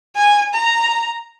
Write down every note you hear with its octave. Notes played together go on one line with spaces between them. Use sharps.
G#5
A#5